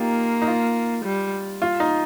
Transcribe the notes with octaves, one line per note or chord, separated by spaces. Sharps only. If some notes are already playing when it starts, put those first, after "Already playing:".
Already playing: A#3 D#4 F4 G4
D#4
F4
G3
F4
D#4